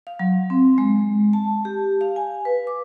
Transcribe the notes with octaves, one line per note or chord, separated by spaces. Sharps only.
F5
F#3
C4
G#3
A5
G4
F5
G#5
B4
D6